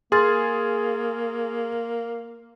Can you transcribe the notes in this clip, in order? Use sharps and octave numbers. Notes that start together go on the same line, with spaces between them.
A#3 G#4 C6 F6 A6